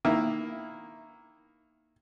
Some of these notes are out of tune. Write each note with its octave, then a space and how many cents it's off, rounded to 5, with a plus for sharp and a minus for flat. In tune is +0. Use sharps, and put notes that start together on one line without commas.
D#3 +0 A#3 +0 E4 +0